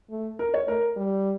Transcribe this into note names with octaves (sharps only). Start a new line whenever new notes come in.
A3
A#4
C#5
A3 A#4
G3